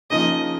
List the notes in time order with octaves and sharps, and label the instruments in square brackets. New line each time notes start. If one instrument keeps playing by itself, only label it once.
[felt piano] C#3 F3 A#3 D#4 G#4 [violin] D#5